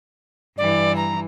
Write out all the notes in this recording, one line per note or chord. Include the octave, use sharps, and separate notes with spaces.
G2 E3 D5
A#5